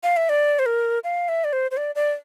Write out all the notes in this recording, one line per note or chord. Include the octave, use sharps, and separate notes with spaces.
F5
E5
D5
C5
A#4
F5
E5
D5
C5
C5
D5
D5